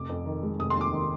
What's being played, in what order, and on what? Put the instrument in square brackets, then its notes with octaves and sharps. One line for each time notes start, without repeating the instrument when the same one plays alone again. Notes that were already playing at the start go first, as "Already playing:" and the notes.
Already playing: [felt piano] F1 D6
F2
D#3
G#3
F1 D#6
C6
D#2
D6
D#3